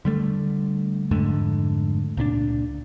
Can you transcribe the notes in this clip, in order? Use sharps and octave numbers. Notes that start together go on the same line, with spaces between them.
D3 G3 A3
F2 G#2 D3 A3
C#2 A#2 C#4 D4